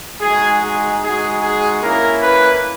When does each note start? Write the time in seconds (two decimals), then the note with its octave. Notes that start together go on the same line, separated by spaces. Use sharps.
0.21 G#3 D#4 F#4 G#4
0.62 G#4
1.01 G#3 D#4 F#4 G#4
1.41 G#4
1.82 A#3 C#4 E4 A#4
2.22 B4